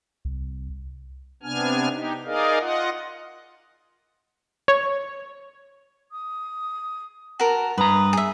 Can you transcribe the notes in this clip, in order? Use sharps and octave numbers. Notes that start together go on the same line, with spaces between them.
C2
C3 B3 D4 G#5 F6
D#4 G4
D#4 G#4 A#4 D5 D#5 F5
F4 D#5 F#5
C#5
D#6
F#4 A#4 A5
G2 B4 A#5 D#6
G#4 E5